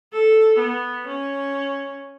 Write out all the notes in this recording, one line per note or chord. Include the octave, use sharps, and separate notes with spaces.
A4
B3
C#4